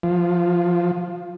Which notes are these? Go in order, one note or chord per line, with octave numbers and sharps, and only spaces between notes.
F3